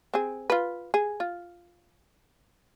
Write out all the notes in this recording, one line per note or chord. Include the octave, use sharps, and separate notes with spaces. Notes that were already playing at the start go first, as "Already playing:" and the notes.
C4 G#4
F4 B4
G#4
F4